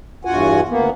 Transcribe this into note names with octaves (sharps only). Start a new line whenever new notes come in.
E2 G2 F4 F#4 F#5 G#5
D2 A#3 B3